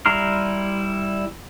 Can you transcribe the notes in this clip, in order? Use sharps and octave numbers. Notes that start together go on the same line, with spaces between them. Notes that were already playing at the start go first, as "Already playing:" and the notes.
G3 E4 A#5 C6 F6